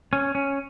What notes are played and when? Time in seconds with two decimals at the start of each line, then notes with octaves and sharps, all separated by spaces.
0.13 C#4
0.35 C#4